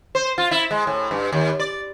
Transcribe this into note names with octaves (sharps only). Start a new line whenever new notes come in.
C5
F4
E4
G#3
A2
G2
D#2
D5